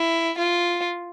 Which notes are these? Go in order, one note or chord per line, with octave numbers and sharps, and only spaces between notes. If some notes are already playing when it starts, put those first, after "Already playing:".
Already playing: E4
F4